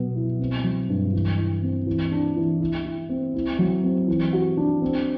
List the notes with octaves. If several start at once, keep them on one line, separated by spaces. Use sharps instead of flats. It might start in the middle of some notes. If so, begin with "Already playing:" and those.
Already playing: B2 F#3 B3
E4
C4
F#3
G2
E3
E3
C4
E3
D4
E3
E4
E4
C4
E4
F#3
C4
E3
F#4
D4
C4